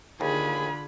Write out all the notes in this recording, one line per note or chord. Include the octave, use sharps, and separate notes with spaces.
D#2 D3 F4 G#4 B5